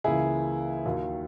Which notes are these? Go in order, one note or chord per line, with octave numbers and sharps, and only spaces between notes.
C#2 C#3 E3 A#3 E4 G#4
D#2 D#3 F#3